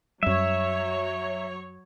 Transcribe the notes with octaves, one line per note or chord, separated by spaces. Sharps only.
F#2 F#3 G3 C#5 E5